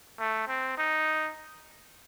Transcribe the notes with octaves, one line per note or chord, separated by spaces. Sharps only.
A3
C4
D#4